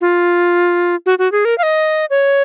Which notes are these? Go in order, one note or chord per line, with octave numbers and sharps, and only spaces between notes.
F4
F#4
F#4
G#4
A#4
F5
D#5
C#5